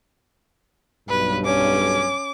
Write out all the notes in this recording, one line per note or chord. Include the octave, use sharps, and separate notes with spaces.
B1 G2 B4
C#4 D6